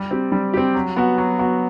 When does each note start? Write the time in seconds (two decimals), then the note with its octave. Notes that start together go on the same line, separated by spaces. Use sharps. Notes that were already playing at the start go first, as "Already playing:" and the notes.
Already playing: G3
0.11 C4 G4
0.32 G3
0.54 C4 G4
0.74 F#3
0.96 B3 F#4
1.18 F#3
1.39 B3 F#4